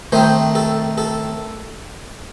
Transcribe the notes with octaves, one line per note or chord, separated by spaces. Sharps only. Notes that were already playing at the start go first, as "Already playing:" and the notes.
D#3 A3 C4 D#4 C5
A4
A4